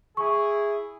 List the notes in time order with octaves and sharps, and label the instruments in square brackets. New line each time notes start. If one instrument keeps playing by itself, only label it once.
[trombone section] E4 G#4 [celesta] C#6